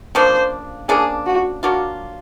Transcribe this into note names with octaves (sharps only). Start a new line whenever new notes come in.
C#3 F3 A#3 D4 C5
C#3 F3 A#3 D4 G#4
F#4
F#3 A#3 D4 F4 F#4